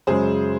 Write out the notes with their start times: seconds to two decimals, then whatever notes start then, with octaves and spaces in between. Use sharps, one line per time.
0.07 F#2 C#3 G#3 G#4 C5